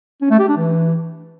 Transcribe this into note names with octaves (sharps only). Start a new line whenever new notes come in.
C#4
A3
G4
D4
E3